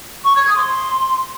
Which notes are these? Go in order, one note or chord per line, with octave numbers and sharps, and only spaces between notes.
C#6
G#6
D#6
C6